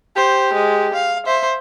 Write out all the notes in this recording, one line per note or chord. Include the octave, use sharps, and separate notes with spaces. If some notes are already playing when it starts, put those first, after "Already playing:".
G4 C5
G#3
F5
C5 E5